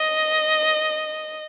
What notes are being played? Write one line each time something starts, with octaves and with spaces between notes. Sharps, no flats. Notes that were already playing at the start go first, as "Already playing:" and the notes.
Already playing: D#5